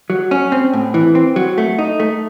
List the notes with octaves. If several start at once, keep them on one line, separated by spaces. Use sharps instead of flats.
F#3
C#4
C4
A2
E3
C4
F#3
A3
D#4
A3